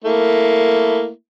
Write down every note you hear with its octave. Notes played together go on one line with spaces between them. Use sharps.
A3 A#3 E4